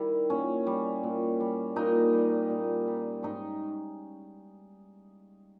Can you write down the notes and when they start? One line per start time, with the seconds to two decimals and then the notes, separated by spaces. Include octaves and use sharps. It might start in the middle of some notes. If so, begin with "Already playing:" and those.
Already playing: D#3 G3 E4
0.30 A#2 C#4
0.67 G3
1.03 A#2
1.40 G3
1.76 A#2 D#4
2.13 G3
2.50 A#2
2.87 G3
3.23 G#2 D#4